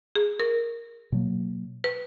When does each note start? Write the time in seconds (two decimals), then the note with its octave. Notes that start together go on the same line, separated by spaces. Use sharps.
0.16 G#4
0.40 A#4
1.12 B2 F#3 A#3
1.84 B4